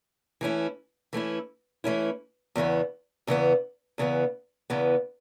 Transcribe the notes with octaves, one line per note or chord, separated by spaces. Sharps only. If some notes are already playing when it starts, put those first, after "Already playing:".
E3 A3 C#4 E4
E3 A3 C#4 E4
E3 A3 C#4 E4
E2 C#3 E3 B3
E2 C#3 E3 B3
E2 C#3 E3 B3
E2 C#3 E3 B3